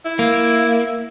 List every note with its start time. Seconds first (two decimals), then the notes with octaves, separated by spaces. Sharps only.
0.05 E4
0.19 A#3